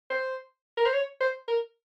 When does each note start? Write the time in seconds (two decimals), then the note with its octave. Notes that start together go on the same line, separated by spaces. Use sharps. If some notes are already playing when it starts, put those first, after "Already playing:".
0.10 C5
0.77 A#4
0.86 C5
0.94 C#5
1.21 C5
1.48 A#4